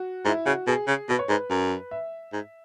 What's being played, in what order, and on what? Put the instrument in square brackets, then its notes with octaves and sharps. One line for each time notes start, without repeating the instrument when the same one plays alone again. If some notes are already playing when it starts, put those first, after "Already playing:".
Already playing: [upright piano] F#4
[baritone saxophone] G#2 [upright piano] E4
[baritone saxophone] C#3 [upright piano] F#4
[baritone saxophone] B2 [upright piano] G#4
[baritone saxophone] C#3
[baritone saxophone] B2 [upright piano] B4
[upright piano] C#5
[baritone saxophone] G#2 [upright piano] B4
[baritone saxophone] F#2
[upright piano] E5
[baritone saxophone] G#2